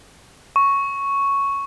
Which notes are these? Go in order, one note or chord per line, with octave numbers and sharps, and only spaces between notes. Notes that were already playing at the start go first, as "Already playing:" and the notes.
C#6